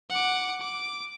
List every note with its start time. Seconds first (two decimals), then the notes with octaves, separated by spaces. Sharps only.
0.10 F#5 D6
0.61 D6